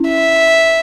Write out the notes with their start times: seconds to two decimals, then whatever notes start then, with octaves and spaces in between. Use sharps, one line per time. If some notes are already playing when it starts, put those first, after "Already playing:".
Already playing: C#4 E4
0.08 E5